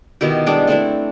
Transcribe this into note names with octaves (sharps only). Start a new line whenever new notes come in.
B2 D#3 E4 G4
G3 G#3 D4 D6
A3 C4 D4 E4